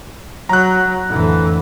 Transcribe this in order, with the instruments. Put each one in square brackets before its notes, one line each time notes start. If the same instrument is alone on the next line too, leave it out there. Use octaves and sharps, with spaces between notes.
[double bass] F#3 [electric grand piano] A#5 F#6
[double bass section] F2 A2 D3 [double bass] E3